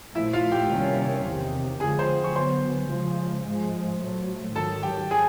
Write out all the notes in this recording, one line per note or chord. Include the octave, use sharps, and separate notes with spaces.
A#2 F3 A3 E4 E5
F4 F5
G4 G5
C3 D#3 G3 A#3 C#4
E2 C3 D#3
F2 D3 F3 G#3 G#4 G#5
C5 C6
C#6
D3 F#3 B3 C5 C6
C#3 F3 G#3
G#2 F3 G#3
A#2 F#3 A3
G#2 D#3 F#3 A4 A5
G4 G5
G#4 G#5